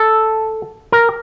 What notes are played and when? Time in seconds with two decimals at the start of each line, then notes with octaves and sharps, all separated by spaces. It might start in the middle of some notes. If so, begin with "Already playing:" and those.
Already playing: A4
0.92 A#4